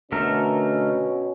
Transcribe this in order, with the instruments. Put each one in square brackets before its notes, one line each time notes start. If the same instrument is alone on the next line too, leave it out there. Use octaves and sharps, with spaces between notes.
[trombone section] B2 C#4 [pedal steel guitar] D3 A3 A#4